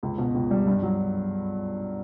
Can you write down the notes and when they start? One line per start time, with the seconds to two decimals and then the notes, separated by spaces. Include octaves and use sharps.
0.03 C#2
0.18 B2
0.34 C#2
0.51 G3
0.67 G2
0.83 F#3